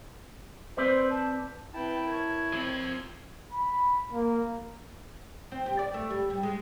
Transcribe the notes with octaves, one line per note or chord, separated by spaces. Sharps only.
C4 B4 C5 D5
A5
C4 E4 B4 G5 A5
A#4 C#5 G#6
F3 C4
B5
A#3
C4
G4
D5
A3
G3
G3
G#3